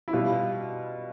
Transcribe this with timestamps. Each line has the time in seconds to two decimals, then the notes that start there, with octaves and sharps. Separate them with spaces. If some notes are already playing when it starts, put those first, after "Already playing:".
0.08 E4
0.13 B2 G3 F4